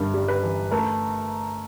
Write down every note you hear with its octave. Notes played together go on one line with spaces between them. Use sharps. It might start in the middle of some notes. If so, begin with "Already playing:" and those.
Already playing: G1 G2 A#4
G3
B4
E3
A3 A#4